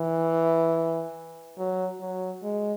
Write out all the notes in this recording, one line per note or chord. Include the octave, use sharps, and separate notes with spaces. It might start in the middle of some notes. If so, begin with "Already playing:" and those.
Already playing: E3
F#3
F#3
G#3